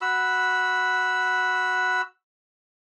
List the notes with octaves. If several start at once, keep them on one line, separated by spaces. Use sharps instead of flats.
F#4 B5 E6